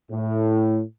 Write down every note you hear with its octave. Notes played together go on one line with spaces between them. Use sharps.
A2